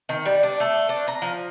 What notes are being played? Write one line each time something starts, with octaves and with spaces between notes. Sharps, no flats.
D#3
G3
D4
A3
D4
A#5
F3